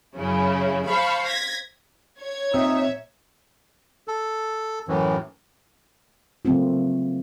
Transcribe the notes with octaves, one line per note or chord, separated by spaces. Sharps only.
F#2 C#3 C#4 E4
C5 F5 A5 B5 C#6
G#6 A#6 B6
C#5 G#6
A#2 C4 D#4 E5 E6
A4
F#2 A2 E3
C#3 F#3 A3 A#3 C4 F4